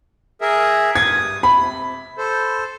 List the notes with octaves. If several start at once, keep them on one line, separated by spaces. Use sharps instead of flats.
G#4 A#4 E5
G2 D#6 G#6
C3 B5
A4 C5